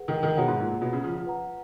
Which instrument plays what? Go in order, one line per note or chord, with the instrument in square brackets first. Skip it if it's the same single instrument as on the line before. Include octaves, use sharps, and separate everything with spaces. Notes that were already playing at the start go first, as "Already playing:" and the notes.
Already playing: [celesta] G#4 B4 F#5
[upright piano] D#3
D#3
[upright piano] B2 [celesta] G#4 C#5 F#5 A#5
[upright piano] G#2
A#2
A#2
B2
C#3
F3
F3
[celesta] B4 F#5 A#5